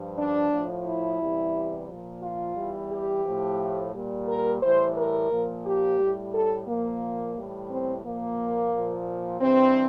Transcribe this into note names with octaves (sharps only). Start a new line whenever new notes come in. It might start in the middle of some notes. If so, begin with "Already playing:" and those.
Already playing: G2 F3
D4
A2 F3
E4
E2 C3 E3 G3
A#2 F3
F4
E2 E3 G3
G4
A2 F3
A#2 G3
A#4
A2 E3 G3 C5
A#4
A#2 F3
G4
A2 G3
A4
A#2 F3 A#3
A2 E3 G3
C4
A#2 F3 A#3
A#2 F3
G2 E3 G3 C4